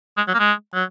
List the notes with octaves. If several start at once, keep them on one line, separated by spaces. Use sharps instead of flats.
G#3
F#3
A#3
G#3
F#3